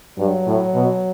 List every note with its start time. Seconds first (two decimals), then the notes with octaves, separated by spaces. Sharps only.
0.18 G2 F#3
0.47 A2
0.75 B2